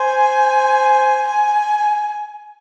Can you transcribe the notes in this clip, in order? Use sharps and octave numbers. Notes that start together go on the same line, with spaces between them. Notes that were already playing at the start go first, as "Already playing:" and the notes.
Already playing: C5 G#5
G#5